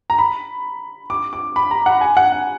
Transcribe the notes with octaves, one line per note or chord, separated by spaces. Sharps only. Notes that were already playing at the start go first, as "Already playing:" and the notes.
A#5
B5
D6
D6
B5
A#5
F#5
G#5
F#5
F#5